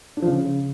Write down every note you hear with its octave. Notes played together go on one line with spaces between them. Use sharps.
D4
F3
C#3